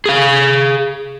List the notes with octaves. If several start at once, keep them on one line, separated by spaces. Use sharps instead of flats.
G#4 F5